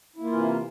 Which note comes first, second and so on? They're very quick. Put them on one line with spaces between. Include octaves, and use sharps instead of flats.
E4 A#3 F4 E3 C3